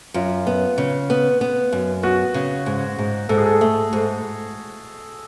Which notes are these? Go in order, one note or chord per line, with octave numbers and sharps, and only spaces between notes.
F#2 F4
B3
C#3
B3
B3
F#2
B3 F#4
C#3
G#2
G#2
G#2 A4
G#4
A4
A3
G#2